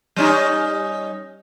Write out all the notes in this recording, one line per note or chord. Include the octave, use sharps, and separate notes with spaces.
G3 C#4 D#4